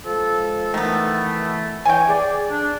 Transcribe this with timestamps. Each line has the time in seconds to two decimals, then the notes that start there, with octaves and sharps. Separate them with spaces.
0.05 F3 G#3 A4
0.74 D#3 E3 A3 B3
1.85 E3 C#5 G5 G#5
2.08 G#4 D5
2.49 D4